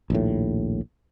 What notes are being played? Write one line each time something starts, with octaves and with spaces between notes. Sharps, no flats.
A#1 D#2 A2